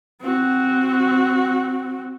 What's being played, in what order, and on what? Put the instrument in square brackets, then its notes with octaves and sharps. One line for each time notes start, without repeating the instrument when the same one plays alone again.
[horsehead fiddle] C4 F#4